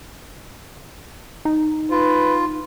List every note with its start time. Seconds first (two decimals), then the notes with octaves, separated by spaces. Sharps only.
1.45 D#4
1.91 F4 B4